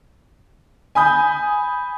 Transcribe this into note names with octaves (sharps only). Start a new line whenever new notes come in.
G#5 B5 D#6 G6